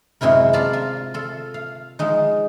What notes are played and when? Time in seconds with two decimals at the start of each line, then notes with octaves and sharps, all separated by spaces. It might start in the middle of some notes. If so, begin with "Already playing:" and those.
0.21 F#2 C3 G#3 E4 A#4
0.53 F4 D5 A5 A#5
0.73 F4 A#4
1.14 F4 A4
1.54 F5
1.99 F3 G#3 D#4